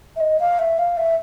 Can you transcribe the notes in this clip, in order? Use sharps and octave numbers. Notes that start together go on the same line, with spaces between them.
E5
D#5
F5
E5
F5
E5